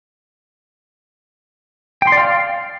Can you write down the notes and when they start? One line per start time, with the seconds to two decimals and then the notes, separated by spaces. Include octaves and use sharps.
2.02 G5
2.07 C6
2.12 D5
2.17 F5